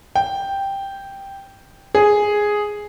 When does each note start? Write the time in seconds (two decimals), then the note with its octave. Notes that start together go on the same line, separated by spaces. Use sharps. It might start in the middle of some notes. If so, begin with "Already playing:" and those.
0.16 G5
1.95 G#4